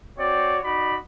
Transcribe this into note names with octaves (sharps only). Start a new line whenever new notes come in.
C4 F#4 C#5 D5
D#4 F#4 D5 B5